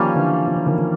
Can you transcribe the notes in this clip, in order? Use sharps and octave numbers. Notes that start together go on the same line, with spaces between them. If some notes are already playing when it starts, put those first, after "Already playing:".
Already playing: D#3 F3 G3 A#3 C#4
D3 E3
F3
E3
D#3 F3
D#3 F3